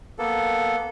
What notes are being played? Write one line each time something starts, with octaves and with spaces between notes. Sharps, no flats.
A#3 B3 A4